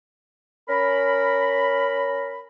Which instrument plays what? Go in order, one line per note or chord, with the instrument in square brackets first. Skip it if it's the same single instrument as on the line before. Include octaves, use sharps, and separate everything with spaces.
[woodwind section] C#4 A#4 B5